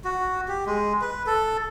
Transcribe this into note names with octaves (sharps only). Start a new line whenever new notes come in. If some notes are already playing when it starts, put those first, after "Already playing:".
F#4
G4
G#3
B4
A4